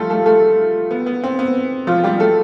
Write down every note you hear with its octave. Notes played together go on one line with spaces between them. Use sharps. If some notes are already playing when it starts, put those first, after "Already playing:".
Already playing: F3 G3 A3 F4 G4 A4
A3 A4
A3 A4
B3
B3
C4
B3
F3 F4
G3 G4
A3 A4